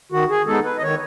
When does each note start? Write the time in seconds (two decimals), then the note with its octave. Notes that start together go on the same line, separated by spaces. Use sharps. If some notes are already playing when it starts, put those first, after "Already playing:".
0.12 D#3 F#4
0.30 G#4
0.47 G#3 B3 D#4 A4
0.64 B4
0.78 D#5
0.82 D#3 C#5